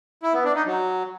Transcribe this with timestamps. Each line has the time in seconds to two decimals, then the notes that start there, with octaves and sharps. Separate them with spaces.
0.23 E4
0.34 B3
0.44 D4
0.55 D#4
0.66 F#3